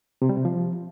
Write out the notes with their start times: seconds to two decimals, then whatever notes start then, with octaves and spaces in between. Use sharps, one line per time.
0.22 C3
0.29 G3
0.37 C3
0.45 F3